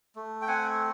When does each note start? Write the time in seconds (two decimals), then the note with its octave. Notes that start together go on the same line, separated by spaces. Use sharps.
0.16 A3
0.42 G5
0.48 C4 F#5 G#5